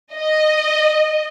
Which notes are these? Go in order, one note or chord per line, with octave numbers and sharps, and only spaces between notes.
D#5